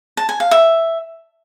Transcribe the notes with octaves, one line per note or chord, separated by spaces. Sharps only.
A5
G#5
F5
E5